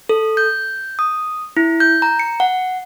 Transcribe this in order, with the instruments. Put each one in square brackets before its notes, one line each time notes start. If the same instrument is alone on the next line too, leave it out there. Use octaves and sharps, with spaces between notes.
[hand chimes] A4
G6
D#6
E4
G6
A#5
C#7
F#5